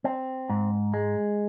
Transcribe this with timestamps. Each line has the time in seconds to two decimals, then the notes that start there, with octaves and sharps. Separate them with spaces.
0.04 C4
0.49 G#2
0.94 G#3